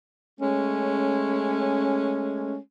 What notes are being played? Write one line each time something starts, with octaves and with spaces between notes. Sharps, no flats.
G#3 A3 C#4